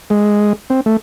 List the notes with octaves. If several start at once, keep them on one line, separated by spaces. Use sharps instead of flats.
G#3
C4
A3